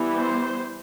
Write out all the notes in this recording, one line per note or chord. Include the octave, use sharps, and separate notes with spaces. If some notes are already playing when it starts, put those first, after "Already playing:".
Already playing: E3 G3 B3
C5